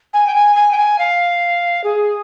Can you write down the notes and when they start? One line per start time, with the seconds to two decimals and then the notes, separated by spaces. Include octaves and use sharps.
0.14 G#5
0.27 G5
0.35 G#5
0.56 G#5
0.72 G5
0.77 G#5
0.99 F5
1.84 G#4